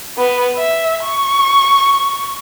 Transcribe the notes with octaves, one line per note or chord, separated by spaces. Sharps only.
B3
E5
C#6